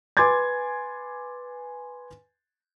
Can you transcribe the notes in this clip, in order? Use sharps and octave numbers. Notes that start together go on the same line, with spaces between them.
B4 G#5 C6 D6 G#6 A6